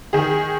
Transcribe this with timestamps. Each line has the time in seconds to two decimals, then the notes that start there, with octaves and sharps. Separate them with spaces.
0.13 D#3 G#4